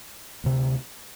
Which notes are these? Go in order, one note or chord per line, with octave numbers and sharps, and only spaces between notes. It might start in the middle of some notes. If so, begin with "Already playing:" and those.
D2 C3